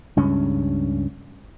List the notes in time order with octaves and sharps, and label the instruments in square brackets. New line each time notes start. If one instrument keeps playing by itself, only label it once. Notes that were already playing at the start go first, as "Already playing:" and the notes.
[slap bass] C#2 G2 C#4